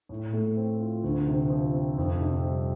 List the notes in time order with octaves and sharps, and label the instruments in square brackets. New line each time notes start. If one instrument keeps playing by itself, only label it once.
[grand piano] A2
A3
C4
F4
D2
C3
F3
C4
F2
C3
G3